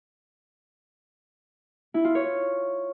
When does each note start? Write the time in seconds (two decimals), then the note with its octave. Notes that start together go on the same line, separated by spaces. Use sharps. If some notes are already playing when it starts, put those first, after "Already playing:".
1.94 E4
2.05 F4
2.15 C#5